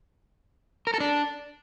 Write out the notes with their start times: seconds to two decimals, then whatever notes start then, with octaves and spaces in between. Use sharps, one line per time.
0.87 A#4
0.94 A4
1.00 D4